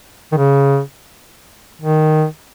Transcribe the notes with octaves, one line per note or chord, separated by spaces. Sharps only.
D#3
C#3
D#3